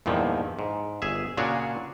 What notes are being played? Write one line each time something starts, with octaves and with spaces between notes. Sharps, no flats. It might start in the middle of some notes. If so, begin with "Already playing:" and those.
E2 G2 A#2 D#3 F3
G#2
G1 G#4 E5
A#2 C#3 D4 F#4 G#4 C#5